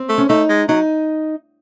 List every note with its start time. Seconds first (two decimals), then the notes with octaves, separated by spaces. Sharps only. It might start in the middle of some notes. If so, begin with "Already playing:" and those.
Already playing: C4
0.09 A3
0.18 C#4
0.29 A3 D#4
0.49 G#3
0.68 F#3 D#4